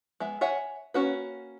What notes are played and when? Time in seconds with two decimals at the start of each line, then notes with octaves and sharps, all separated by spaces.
0.20 G#3 B3 E5
0.41 C#5 E5 F#5 G#5
0.94 A#3 C#4 F#4 B4